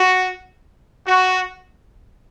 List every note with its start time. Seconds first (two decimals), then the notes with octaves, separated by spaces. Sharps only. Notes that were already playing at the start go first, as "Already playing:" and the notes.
Already playing: F#4
1.07 F#4